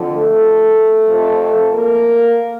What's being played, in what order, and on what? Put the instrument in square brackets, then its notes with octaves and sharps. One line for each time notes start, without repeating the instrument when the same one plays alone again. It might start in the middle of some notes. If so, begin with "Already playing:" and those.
Already playing: [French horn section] F2 D3 F3
A3 A4
F2 C3 F3
A#3 A#4